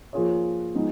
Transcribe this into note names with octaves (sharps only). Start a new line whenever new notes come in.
F3 A#3 F4 G#4 C#5
F3 G#3 B3 D#4